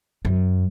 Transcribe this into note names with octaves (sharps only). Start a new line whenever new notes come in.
F#2